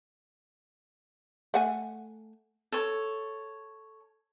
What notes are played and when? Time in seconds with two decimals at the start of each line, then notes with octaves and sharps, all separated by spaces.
1.54 A3 F#5 G#5
2.72 A4 C#5